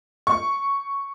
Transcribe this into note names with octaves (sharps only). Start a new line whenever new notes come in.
C#6